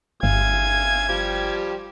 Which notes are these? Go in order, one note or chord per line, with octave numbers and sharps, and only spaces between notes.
G1 E5 F5 G#5 G#6
F3 G3 G4